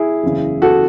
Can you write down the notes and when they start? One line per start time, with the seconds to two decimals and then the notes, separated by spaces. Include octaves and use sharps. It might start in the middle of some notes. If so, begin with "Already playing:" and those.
Already playing: E4 G#4
0.23 F#1 E2 C#3
0.62 F#4 A4